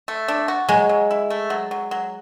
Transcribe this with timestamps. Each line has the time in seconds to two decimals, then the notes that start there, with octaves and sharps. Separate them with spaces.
0.08 A3
0.28 D4
0.48 F#4
0.69 F#3 G#3
0.89 F#3
1.11 E4
1.30 A3
1.50 F#3
1.71 F#3
1.91 F#3